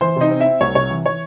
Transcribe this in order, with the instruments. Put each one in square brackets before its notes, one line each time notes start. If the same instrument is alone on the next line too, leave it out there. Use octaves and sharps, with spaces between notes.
[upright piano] E3 C5 C6
C3 D#4 D#5
C4
E4 E5
C4
C2 C#5
C3 C#5
E3
E3 C#5